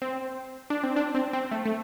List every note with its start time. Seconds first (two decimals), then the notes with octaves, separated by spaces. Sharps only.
0.02 C4
0.70 D4
0.83 C4
0.96 D4
1.15 C4
1.33 C4
1.52 A3
1.66 A3